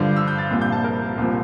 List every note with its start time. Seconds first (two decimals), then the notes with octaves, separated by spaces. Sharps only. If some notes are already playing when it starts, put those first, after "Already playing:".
Already playing: G2 D3 F3 G6
0.16 E6
0.28 G6
0.38 A6
0.50 C2 A#2 F3
0.61 G6
0.72 A5
0.84 A#4
1.17 C2 A#2 F3